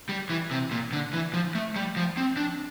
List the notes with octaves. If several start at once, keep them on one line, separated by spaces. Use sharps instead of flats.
G3
E3
C3
A#2
D3
E3
F3
A3
G3
F3
C4
D4